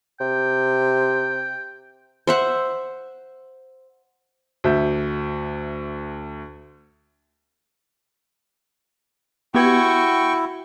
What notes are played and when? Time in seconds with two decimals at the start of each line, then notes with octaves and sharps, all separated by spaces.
0.21 C3 G5
2.27 C5 E5 F#5
4.64 D2 E5 G6
9.55 B3 E4 F#4 G4 G5 C#6 G#6